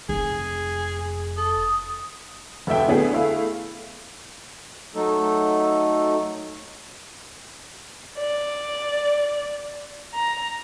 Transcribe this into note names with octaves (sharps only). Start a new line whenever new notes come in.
F1 G#4
A4 D#6
F1 D2 A4 E5 G5
D3 B3 G#4
A3 E4 F5
F#3 A3 D#4 A4
D5
A#5